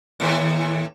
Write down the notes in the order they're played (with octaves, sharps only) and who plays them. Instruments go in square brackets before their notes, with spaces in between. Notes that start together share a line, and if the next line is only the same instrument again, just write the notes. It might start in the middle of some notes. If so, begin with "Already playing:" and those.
[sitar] D#2 A2